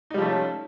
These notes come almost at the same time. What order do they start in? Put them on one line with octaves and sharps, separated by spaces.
D#4 G3 F3 A3 C#4